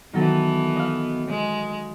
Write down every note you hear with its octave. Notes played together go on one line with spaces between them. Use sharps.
D#3 E3 F#3 B3 A4
D#5 F5
G#3